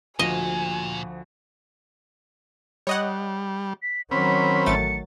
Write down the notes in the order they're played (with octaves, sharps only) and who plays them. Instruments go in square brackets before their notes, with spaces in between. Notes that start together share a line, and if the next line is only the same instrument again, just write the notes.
[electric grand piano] D2 F3 F#4 [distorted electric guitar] A#2 [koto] D#5 [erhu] G#5
[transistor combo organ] G3 [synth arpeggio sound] C#5 D#5 F#5
[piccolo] B6
[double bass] D#3 F#3 [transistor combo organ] C4 C#4 B5 [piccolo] B6
[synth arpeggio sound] A1 A3 A6 [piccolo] C#7